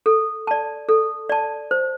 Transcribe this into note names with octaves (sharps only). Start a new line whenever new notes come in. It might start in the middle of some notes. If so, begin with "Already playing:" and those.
A4
D5 A5
A4
D5 A5
C5